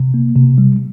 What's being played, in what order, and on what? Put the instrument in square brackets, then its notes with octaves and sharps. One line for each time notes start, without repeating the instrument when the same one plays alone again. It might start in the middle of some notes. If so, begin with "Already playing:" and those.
Already playing: [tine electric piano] C3
A#3
C3
G3